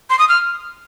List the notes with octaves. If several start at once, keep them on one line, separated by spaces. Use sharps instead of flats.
C6
D#6
F6